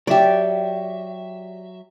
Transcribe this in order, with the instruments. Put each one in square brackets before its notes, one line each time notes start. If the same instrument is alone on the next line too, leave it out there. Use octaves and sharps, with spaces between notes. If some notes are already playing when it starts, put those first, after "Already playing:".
[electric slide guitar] F#3 E5 [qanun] G4 D5